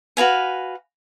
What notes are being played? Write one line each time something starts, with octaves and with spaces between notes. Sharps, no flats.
F#4 B4 F5 G#5